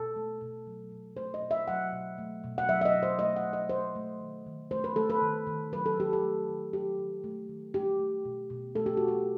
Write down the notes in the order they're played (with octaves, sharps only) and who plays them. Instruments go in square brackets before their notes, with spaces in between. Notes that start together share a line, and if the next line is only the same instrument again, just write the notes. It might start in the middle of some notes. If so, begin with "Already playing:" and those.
Already playing: [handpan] B2 A4
A3
B2
F#3
B2
A3 C5
D#5
B2
E5
F#3 F#5
B2
A3
B2
F#5
F#3 E5
E5
D#5
B2
C5
A3 D#5
F#5
B2
D#5
A3 C5
A3
D#3
D#3
A3 C5
B4
A3 A4
B4
D#3
D#3
F#3 B4
A4
D#3 G4
A4
A3
D#3
F#3 G4
D#3
A3
D#3
A3 G4
A3
B2
B2
A3 A4
G4
A3 F#4
G4